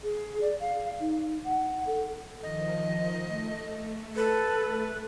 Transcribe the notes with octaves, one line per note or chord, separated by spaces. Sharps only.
G#4
D5
F5
D#4
F#5
A4
D#3 F3 D#5
A3
A4 B4
A3